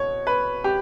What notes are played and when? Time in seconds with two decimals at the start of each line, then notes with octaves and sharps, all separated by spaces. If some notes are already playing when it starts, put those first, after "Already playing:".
Already playing: B2 C#5
0.27 B4
0.64 G4